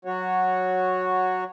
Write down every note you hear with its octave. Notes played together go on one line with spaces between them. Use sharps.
F#3 F#4 C#5